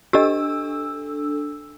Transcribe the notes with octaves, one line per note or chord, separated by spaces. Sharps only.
D4 G4 A4 D#5 E6